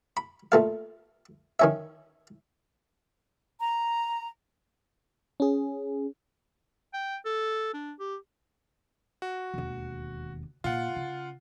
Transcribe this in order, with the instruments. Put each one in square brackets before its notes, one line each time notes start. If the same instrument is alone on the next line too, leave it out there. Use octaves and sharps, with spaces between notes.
[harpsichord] B5
A#2 A3 F5
D#3 C#4 E5
[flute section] A#5
[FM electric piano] C#4 G#4
[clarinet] G5
A4
D4
G4
[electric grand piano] F#4
[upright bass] E1 D#2
[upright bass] A#2 [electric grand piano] F4 F#5
[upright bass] C#3